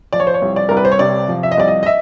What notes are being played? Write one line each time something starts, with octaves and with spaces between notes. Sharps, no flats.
F3 D5
C#5
C5
C#5
C2
D5
C2 A#4
B4
C5
C#5
C3 D5
F3
E5
D#5
C2 D5
D#5
D#5
E5